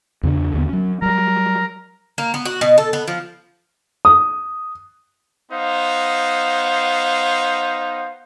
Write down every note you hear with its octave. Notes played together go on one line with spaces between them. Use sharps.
E2 C#3 D4
D#2 D3 B3
F#3 C#4
F#3 G3 A#4
A#3
B3
F#4
B2
A4
B3
F3
D#6
B3 D#4 C5 F5